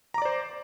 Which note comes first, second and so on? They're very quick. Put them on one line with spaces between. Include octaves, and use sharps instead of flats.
A#5 D6 D5 C5